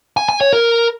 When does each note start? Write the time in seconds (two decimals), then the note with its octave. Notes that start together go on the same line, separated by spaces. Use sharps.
0.17 G#5
0.29 G#5
0.41 C#5
0.53 A#4